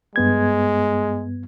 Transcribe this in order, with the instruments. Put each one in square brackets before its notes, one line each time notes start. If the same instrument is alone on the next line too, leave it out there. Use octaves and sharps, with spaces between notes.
[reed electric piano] G2 B3 G#6 [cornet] G#3